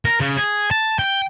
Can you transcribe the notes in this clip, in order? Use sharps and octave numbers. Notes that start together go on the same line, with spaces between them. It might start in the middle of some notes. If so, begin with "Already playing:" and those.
A#4
C#3
G#4
A5
G5